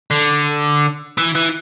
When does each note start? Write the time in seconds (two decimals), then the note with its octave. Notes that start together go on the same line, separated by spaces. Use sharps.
0.10 D3
1.18 E3
1.35 E3